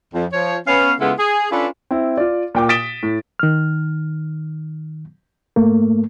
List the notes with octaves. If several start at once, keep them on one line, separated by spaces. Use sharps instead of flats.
F2
F3 C#5
B3 C#4 F5
C#3 G#3 B3 E4 F4 A4
G#4
C#4 D4 F4 A4 B4
C4 E4
F4 D5
A#2 G5 D6
D#6 A6 B6 D7 E7 G7
A2
D#3 F6
G#2 A3 A#3